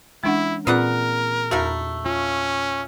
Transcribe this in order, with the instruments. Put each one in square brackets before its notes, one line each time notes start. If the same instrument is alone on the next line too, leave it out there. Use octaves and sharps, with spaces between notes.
[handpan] E3 C#4 [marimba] G#3 D4 F#5 [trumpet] E4
[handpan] A#2 G#4 [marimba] C4 F4 [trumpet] A#4 [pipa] B4 D5 F#5
[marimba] E2 F#4 [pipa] A3 D#4 E4
[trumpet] C#4 [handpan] F4